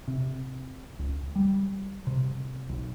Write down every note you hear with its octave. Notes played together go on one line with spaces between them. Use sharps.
C3
C#2
G3
C3
B1